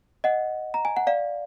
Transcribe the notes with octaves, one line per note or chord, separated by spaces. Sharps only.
D#5 F#5
A#5
G#5
F#5
D5 F5